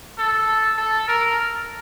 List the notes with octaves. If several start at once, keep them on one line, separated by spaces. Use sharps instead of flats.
A4
A4
A#4